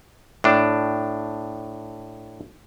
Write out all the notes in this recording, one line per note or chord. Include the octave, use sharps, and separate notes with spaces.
A2 D4